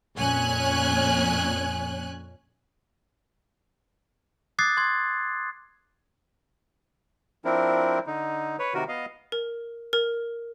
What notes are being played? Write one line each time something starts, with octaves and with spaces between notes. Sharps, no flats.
F2 A#2 C#4 C#5 G#5 F#6
D6 D#6 F#6 G#6 A6 C7
C6 G#6
F3 C4 D4 E4 A#4
D3 D#4
B4 C#5
C3 D#3 F#4 A#4
B3 D#5 F5
A#4
A#4